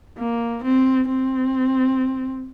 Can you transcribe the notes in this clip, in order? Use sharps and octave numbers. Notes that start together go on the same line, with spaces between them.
A#3
C4
C4